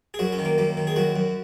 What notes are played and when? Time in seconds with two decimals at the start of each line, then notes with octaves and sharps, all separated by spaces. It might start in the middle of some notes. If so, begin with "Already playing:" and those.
0.14 G#4
0.19 F#2 F#4
0.32 C#4
0.39 D#3
0.45 A#3
0.58 F#2 A#3
0.77 D#3
0.87 G#4
0.96 F#2 F#4
1.16 F#2